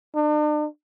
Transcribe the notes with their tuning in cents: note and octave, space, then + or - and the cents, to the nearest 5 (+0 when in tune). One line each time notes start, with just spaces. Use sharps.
D4 +40